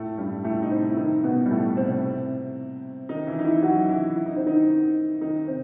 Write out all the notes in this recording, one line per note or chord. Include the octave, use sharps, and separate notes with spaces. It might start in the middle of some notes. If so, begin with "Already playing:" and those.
Already playing: A2 A3
G2 G3
A2 A3
D#4
C3 C4
E4
D#3 D#4
B2 B3
G3
A2 A3
C3 C4
D#3 D#4
E3 E4
D#4
E3 E4
F#3 F#4
E3 E4
E4
D#4
C4
D#3 D#4
D#3 D#4
C3 C4